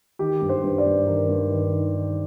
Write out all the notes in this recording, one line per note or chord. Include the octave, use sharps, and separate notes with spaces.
D#3 G4
G2
C5
G2
D5
G2
D#3 A#4
G2
D#3
D#3
D#3